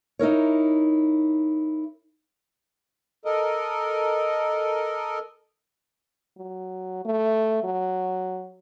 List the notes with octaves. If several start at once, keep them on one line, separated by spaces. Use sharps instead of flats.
D#4 E4 A#4 C#5
A4 A#4 D#5
F#3
A3
F#3